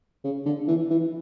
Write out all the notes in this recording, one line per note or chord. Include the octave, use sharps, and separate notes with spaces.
C#3
D3
E3
E3